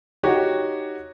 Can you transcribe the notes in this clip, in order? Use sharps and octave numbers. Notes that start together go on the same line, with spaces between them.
D#4 F#4 G4 C#5